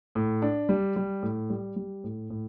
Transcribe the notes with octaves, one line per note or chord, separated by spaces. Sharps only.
A2
D4
G3
G3
A2
G3
G3
A2
A2